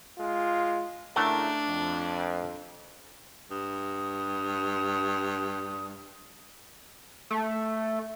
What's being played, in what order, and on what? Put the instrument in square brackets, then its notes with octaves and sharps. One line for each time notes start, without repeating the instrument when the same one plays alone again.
[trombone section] G#3 F4
[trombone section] C#3 E4 A#4 [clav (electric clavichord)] A3 F#5 [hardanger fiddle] D4
[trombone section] F2
[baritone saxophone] G2 [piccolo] D#6
[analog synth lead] A3